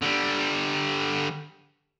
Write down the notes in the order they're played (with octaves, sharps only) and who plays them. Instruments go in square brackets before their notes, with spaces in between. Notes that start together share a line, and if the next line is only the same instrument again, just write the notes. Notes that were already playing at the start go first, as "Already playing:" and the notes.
[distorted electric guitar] D3 G3